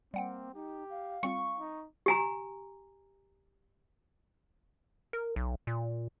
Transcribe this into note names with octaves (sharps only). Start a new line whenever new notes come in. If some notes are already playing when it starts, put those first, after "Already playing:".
G3 A#3 C4 F#5 G5
D#4 G4
F5
G3 C4 F4 C#6
D#4
G4 G#5 A#5
A#4
B1
A#2